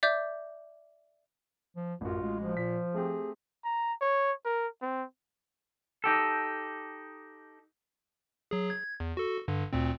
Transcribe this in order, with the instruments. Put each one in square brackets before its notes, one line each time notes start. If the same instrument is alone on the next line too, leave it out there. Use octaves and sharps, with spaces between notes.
[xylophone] D5 E5 D6 G6
[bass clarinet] F3
[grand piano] A1 F#4 [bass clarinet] F#2 [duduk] F4
[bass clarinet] G#3
[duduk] F3
[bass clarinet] A#2 [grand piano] B6
[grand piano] A3 C4 G4 [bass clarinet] G#4
[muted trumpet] A#5
C#5
A#4
C4
[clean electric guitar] D#4 G4 A4
[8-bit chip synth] F#3 G#4
G#6
E2
F#4 A4
G2 D3
D2 A#2 C4